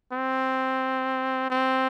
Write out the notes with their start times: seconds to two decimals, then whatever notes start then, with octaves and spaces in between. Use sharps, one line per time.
0.13 C4
1.51 C4